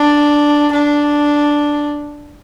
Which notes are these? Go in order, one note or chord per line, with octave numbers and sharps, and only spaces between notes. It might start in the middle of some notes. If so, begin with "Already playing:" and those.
Already playing: D4
D4